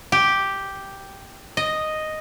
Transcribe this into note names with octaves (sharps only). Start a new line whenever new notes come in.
G4
D#5